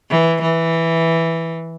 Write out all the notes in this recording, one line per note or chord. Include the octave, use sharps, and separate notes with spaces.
E3
E3